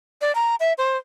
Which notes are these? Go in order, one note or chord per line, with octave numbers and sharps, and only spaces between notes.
D5
A#5
E5
C5